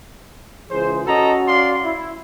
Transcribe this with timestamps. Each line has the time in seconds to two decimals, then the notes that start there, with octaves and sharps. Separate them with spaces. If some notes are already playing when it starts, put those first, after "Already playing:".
0.71 C#2 E3 G#4 C5
1.07 C#4 F#4 A4 D#5 A#5
1.48 D5 F5 C6
1.83 E4